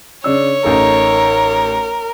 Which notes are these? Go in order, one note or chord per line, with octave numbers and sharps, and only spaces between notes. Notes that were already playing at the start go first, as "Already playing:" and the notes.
C#3 D4 C#5 E6
A1 D#4 A4 A#4